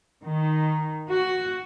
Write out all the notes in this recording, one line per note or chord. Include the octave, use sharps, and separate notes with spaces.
D#3
F#4